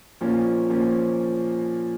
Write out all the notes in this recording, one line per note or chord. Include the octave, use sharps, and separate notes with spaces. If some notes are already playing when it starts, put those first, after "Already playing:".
A#2 F3 A#3 C#4
A#2 F3 A#3 C#4